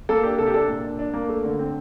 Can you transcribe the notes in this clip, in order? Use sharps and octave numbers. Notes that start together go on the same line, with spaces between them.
A#3 A4
D4 G4
C3 A4
G4
D4 A4
A#2
D4
D4
A#3
A3
D3
C4